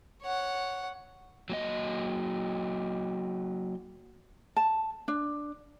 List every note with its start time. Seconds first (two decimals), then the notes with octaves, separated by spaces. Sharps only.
0.23 C#5 F#5
1.50 F#3 A#3 D#5
4.57 A5
5.08 D4